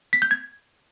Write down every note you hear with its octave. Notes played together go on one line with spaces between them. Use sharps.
B6
G6
G#6